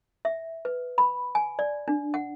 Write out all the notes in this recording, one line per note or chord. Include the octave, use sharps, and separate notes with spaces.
E5
B4
B5
G#5
D5
D4
F#5